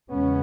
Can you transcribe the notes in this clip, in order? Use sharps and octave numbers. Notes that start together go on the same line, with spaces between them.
E2 C#3 G#3 B3 C#4